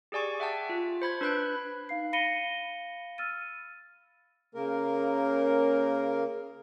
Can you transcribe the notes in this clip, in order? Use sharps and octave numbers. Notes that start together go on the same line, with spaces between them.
G4 G#4 D5 G#5 C#6
E5 F#5 G5 A5
F4
C5 B5 G#6
D4 B4 B5 F#6 D7
D#4 F5 C7
F5 B5 A#6 C#7 D#7 G7
E6 F6 A6 D#7
C#3 A#3 A#4